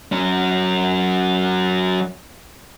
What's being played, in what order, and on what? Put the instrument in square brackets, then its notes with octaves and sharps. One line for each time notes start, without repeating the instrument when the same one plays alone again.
[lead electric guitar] F#3 C#4